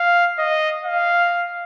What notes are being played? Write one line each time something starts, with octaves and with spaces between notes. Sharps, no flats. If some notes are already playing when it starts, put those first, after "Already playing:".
Already playing: F5
D#5
F5